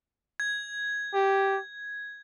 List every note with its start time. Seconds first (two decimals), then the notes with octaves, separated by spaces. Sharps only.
0.40 G#6
1.14 G4